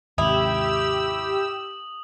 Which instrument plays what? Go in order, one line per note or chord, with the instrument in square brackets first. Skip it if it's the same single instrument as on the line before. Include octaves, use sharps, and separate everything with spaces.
[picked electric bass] D#2 G#2 C3 [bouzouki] E4 [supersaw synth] G4 E6 [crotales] D#6 F#7